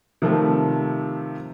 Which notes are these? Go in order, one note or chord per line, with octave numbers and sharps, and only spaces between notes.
C3 D#3 F3 G3 A3